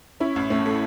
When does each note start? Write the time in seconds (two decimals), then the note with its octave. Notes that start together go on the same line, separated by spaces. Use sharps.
0.20 C#4 E4
0.36 A1
0.50 A2 C#4
0.66 A3